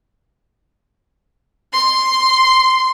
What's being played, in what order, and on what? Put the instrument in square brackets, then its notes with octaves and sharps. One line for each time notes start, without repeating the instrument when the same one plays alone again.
[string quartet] C6